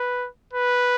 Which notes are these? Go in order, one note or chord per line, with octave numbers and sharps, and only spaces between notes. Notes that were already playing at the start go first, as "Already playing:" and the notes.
Already playing: B4
B4